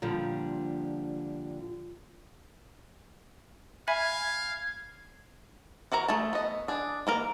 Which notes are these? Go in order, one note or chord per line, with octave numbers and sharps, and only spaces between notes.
A#2 D3 F3 G3
E5 F5 G#5 B5 G#6
E3 F#4 A#4 A#5
A3 G#4 A5
B3 D#5
D4 G#4
E3 A#3 A#4